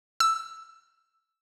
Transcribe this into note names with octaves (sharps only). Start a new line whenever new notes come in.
E6